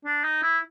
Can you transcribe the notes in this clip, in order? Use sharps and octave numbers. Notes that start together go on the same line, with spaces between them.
D4
D#4
E4